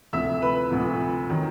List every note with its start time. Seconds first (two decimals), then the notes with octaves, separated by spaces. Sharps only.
0.13 D2 C3 F3 E5 E6
0.42 B4 B5
0.70 D2 C3 F3
1.30 D#3 F#3